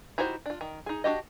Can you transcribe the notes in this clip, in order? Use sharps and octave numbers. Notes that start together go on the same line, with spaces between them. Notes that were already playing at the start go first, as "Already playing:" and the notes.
D#4 E4 F#4 G4 C5
D4 F4
D#3
D#4 G#4
D4 F#4 G4 D#5